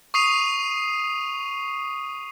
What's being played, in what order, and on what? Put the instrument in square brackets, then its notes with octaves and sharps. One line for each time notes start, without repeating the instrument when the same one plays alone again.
[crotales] C#6 D#6 C7 D#7 F7